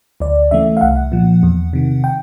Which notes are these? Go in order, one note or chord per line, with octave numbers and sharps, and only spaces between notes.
D2 D5
C#3 E3 A3 E5
F5
C2 F#5
A#2 F3
E2
C3 D#3
G5